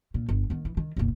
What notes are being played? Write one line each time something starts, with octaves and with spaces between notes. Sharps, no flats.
A#2
G1
D#3 B3
E3
D#3
F#1 B1